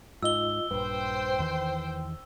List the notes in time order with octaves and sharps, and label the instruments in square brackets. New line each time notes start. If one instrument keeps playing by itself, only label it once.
[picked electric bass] G#2 [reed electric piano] F4 D#5 [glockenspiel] E6 G7
[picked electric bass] A#1 G2 [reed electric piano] B4 [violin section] C5 G5
[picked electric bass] E2 D#3 E3